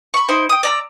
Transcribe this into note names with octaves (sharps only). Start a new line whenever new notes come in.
B5 C#6
D#4 E4 C5
G5 D#6
D5 A#5 E6